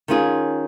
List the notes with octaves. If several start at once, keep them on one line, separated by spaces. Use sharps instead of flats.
D#3 C#4 F4 G#4